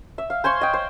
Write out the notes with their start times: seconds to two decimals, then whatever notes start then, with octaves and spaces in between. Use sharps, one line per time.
0.18 E5
0.30 F5
0.44 C5 G#5 C6 C#6
0.61 D#5 G5
0.74 C5